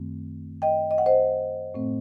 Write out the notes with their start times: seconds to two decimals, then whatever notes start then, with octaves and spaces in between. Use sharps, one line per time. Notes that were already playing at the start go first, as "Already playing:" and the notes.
Already playing: F#2 D#3 A3 C4
0.62 D#5 G5
0.91 D#5
0.98 F#5
1.06 C5 D#5
1.74 A2 A3 C4